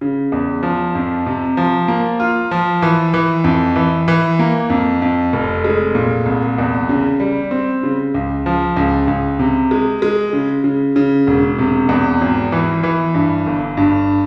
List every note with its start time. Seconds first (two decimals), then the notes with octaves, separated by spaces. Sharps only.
0.01 C#3
0.32 E2
0.63 F3
0.95 F2
1.26 C3
1.57 F3
1.88 A#3
2.20 F4
2.51 F3
2.82 E3
3.14 E3
3.44 F2
3.76 E3
4.08 E3
4.39 A#3
4.70 F2
5.02 F2
5.33 F1
5.64 G#3
5.95 A#2
6.26 C2
6.58 E2
6.89 C#3
7.20 G3
7.51 C4
7.83 C#3
8.14 C#2
8.46 F3
8.77 C#2
9.07 C#2
9.39 C3
9.71 G#3
10.02 G#3
10.33 C#3
10.64 C#3
10.96 C#3
11.27 E1
11.59 C3
11.89 E2
12.21 G#1
12.52 E3
12.83 E3
13.15 G2
13.46 G1
13.77 G2